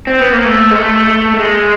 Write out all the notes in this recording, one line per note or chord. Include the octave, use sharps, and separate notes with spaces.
C4
B3
A#3
A3
G#3
A3
A3
A3
G#3